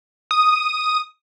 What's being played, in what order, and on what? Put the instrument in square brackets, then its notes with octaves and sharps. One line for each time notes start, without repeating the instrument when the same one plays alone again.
[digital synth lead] D#6